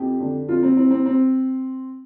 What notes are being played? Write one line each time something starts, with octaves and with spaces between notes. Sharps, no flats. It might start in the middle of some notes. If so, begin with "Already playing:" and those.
Already playing: F2 G4
D3
F2 F4
C4
E3 C4
C4
C4